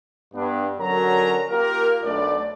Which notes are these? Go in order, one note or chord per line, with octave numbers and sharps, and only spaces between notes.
G2 B3 D4
D3 F#3 C#4 F#4 A#4 A#5
A#3 F4 G4 A#4
B1 A3 D4 D5